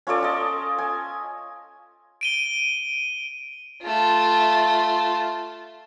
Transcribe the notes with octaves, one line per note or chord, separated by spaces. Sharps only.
C#4 F4 A4 D5
D#5 A5
G#5
D7 D#7 G7
A3 F4